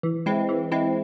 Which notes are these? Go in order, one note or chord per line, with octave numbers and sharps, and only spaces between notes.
E3
G#3 C4 E4
E3
G#3 C4 E4